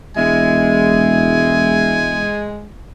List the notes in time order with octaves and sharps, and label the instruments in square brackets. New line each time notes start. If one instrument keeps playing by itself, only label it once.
[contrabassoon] E1 [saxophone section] G#3 [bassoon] E4 [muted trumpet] G#5